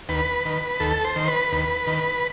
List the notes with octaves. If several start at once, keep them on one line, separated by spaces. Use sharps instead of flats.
D#2 B4
D#3
D#2 A4
C5
D#3
B4
D#2
D#3